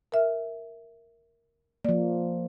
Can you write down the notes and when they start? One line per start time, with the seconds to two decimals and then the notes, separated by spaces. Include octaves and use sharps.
0.12 A#4 E5 F6
1.85 F3 A#3 D5